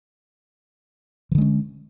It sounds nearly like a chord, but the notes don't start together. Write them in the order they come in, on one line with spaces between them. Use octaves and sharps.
E3 D3 G#3 C#4